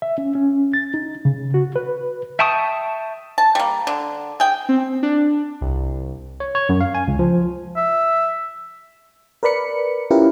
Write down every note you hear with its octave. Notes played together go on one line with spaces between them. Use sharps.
E5
C#4
C#4
A6
D#4
C#3
F#4
B4
E5 G5 A5 C#6 D#6
A5
G3 A#3
D3
G#4 G5
C4
D4
C2
C#5
C#5
F#2
F5
G#5
C#2
F3
E5
A#4 B4 D5 B5 C#7
C#4 E4 F4 G4 A#4 B4